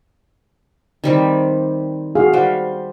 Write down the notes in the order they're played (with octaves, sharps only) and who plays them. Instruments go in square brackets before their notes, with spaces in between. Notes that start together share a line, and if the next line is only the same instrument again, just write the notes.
[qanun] D#3 G3 C4
[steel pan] F#4 G#4 F5
[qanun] G3 C5 [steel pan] F5 F#5